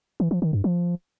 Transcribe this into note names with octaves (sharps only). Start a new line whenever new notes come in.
E3
F3
D#3
G2
F3